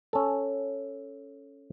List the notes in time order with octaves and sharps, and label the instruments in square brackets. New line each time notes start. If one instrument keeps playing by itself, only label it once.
[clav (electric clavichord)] C#4 A4